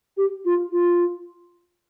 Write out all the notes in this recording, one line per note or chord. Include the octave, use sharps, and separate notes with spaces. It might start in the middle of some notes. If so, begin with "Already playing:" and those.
G4
F4
F4